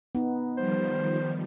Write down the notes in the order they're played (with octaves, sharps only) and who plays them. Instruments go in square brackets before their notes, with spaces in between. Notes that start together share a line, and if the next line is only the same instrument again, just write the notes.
[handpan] B3 D#4
[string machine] D#3 F3 G3 [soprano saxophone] C5